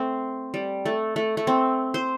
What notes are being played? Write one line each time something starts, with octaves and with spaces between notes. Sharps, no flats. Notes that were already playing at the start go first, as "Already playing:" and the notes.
Already playing: A3 C4
G3
A3
A3
A3
C4
C5